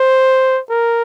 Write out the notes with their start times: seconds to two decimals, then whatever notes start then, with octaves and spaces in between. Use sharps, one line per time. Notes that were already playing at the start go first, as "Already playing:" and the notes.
Already playing: C5
0.69 A#4